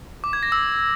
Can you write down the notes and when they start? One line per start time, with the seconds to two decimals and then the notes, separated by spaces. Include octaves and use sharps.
0.24 D6
0.33 G#6
0.43 A#6
0.52 E6